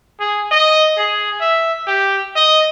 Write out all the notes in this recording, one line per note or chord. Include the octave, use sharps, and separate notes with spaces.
G#4
D#5
G#4
E5
G4
D#5